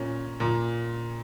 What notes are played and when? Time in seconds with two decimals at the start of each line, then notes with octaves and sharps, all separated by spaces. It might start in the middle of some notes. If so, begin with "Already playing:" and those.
Already playing: A#2 C#4
0.40 A#2